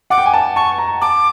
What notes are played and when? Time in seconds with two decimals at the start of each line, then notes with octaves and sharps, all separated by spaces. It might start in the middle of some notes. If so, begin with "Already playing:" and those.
0.10 F#5 D6
0.18 G5
0.26 G#5
0.33 A5
0.56 A5 C#6
0.78 A#5
1.01 A5 D6